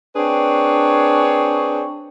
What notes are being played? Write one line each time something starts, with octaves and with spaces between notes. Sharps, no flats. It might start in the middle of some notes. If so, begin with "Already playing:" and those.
C4 D4 G#4 B4 C#5